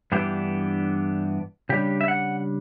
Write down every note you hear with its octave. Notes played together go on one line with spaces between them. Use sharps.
G2 E3 B3 D4 G4
C#3 G3 D4 G4
E5
F#5